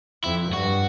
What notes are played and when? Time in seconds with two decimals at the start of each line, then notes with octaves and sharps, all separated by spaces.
0.24 F2 E4
0.53 G2 F#4